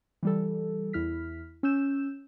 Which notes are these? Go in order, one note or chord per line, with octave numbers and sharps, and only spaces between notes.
E3 G3 A4
E2 E4 F6 B6
C#4 E6 G6 E7